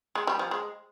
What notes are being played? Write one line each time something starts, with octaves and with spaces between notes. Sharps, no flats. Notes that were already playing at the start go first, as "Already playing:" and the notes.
G#3
G3
F3
G#3